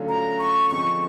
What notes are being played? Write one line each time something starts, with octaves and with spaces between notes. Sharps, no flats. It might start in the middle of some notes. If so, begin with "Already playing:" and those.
Already playing: D3 F#3 A3 C#4 F4
A#5
C#6
D3 F3 G#3 C4 C#6